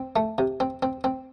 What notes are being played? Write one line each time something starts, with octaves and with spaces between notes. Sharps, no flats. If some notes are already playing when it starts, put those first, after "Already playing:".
Already playing: C4
A3
C3
C4
C4
C4